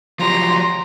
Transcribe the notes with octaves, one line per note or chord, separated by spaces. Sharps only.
F3 F#3 G4 A#5 C6